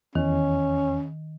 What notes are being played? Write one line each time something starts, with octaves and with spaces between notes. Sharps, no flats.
E2 D#3 C#4